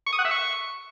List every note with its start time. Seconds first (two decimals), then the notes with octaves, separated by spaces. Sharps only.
0.07 C#6
0.13 D#6
0.19 F#5
0.25 E5
0.31 C#6